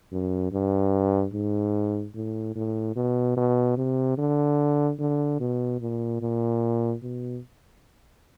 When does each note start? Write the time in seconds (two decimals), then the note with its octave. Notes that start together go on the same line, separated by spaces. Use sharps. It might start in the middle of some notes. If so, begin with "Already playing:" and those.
0.12 F#2
0.52 G2
1.33 G#2
2.15 A2
2.56 A2
2.96 B2
3.36 B2
3.77 C3
4.18 D3
4.99 D3
5.40 B2
5.81 A#2
6.21 A#2
7.02 B2